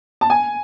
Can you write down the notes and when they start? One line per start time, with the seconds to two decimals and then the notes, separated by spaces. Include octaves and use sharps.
0.21 A5
0.30 G#5